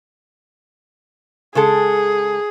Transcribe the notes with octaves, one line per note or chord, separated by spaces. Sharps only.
C#3 G#3 G#4 A4